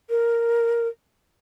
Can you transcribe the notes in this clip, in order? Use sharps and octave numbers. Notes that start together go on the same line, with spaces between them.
A#4